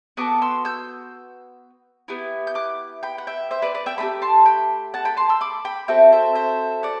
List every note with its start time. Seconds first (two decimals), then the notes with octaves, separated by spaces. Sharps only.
0.17 B3 F#4 A4 D6 F#6
0.42 C6 E6
0.65 E6 G6
2.08 B3 E4 G4
2.47 G6
2.55 D6 F#6
3.03 G5 B5
3.18 F#5
3.27 E5 G5
3.51 C5 E5
3.62 B4 D5
3.74 B4 D5
3.86 E5 G5
3.98 A3 D4 G4 G5 B5
4.22 A5 C6
4.46 G5 B5
4.94 F#5 A5
5.05 G5 B5
5.17 A5 C6
5.29 C6 E6
5.41 B5 D6
5.65 G5 B5
5.88 C4 F#4 A4 E5 G5
6.12 C5 E5
6.35 C5 E5
6.83 D5 F#5